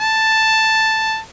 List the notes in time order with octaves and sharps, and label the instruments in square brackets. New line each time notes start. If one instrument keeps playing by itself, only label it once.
[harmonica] A5